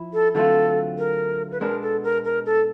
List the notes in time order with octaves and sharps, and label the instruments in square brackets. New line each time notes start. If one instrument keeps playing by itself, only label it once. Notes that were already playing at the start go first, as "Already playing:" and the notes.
Already playing: [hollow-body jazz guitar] F3 E4
[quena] A4
[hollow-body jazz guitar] D3 F#3 A3 C4 F4 [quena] A4
[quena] A#4
B4
[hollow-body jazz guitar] B2 G#3 B3 D4 [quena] A#4
[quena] A4
A#4
A#4
A4